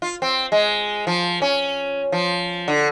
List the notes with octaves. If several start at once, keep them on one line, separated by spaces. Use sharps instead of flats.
F4
C4
G#3
F3
C#4
F3
D3